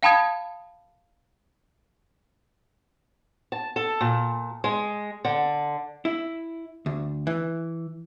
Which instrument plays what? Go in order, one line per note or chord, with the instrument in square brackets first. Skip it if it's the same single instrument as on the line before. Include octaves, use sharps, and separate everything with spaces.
[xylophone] F5 G5 A5 B5 D#6 G#6
[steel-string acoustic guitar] A5
A4
A#2
G#3
D3
[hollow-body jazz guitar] E4
D2
E3